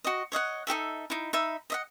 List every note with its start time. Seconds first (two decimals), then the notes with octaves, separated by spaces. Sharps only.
0.04 F#4 D#5
0.32 C#5 D#5 F5 F#5
0.67 D#4 G4 A4 E5
1.10 D#4 E4
1.33 D#4 E5 B5
1.70 D#5 E5 F#5